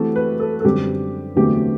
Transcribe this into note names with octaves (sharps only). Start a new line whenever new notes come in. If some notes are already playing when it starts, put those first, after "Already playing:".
Already playing: E3 A3 C4 E4 F#4 G4 A4
B4
A4
A4
F#2 D3 G3 C4 G4
E2 D3 F#3 A3 C4 G4